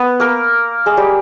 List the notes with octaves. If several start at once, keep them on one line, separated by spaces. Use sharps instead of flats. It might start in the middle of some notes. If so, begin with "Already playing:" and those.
Already playing: B3 B4
A#3 A#4
G#3 G#4
G3 G4